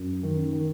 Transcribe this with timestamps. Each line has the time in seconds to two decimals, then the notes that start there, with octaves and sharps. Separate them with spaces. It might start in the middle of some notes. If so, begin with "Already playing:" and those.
Already playing: F#2
0.23 D#3
0.53 D#3